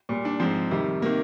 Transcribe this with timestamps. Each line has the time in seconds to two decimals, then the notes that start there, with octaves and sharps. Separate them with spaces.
0.09 A#2 G3
0.25 D4
0.40 G#2 F3 C4
0.71 F2 C3 D#3 G3
1.02 C3 D#3 A#3